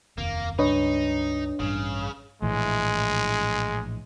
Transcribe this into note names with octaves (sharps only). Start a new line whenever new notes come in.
F1 D#2 C3 A#3
C#2 G2 C#3 D4 D#4 B4 C#5 D#5
A1 G2 C#3
A#1 A2 E3 G#3